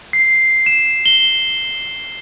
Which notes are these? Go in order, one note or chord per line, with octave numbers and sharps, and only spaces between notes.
C7
E7
G7